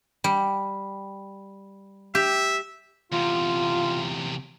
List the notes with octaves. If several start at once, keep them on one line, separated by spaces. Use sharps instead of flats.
G3
G4 E5
E2 C3 F4